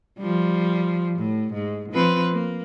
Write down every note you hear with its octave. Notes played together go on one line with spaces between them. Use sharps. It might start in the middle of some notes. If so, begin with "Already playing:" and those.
F3 G3
A2
G#2
F3 C4 B4
A#3